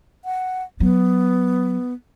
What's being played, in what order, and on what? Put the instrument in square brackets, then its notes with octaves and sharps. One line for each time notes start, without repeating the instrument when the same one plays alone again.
[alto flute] F#5
[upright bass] F#3 [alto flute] B3